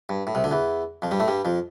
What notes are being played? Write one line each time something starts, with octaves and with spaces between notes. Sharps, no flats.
G2
A2
C2 C3
D2 D3
E2 E3
F2 F3
G2 G3
A2 A3
G2 G3
F2 F3